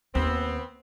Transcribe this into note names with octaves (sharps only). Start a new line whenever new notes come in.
D#2 B3 C4